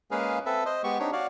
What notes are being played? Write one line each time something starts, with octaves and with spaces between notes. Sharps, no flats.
G#3 A#3 C#4 G#4 B4 F5
C4 A4 B4 E5
C5 D#5
G#3 B3 G4 C#6
C4 D4 D#4 G4 C#5
F#4 C#5 D5 F5